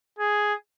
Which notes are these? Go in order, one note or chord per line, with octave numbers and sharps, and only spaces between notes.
G#4